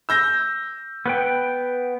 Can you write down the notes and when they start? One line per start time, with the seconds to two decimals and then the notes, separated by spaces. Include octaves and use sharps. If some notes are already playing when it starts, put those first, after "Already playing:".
0.09 E6 G6 A#6
1.06 B3 B4 G5